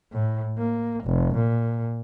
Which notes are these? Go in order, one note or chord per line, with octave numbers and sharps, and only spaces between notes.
A2
A#3
F1
A#2